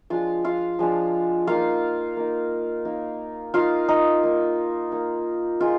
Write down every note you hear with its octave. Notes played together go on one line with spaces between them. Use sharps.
F3 G#3 D4 F4 F5
F4 F5
F3 G#3 D4
A#3 D#4 F4 F5
A#3 D#4
A#3 D#4
A#3 D#4 F4 F5
D#4 D#5
A#3 D#4
A#3 D#4
G#3 D#4 F4